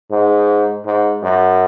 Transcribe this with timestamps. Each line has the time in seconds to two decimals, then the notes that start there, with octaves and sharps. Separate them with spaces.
0.11 G#2
0.86 G#2
1.23 F#2